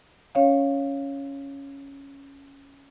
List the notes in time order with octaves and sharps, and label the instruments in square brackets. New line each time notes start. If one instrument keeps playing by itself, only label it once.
[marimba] C#4 C#5 F5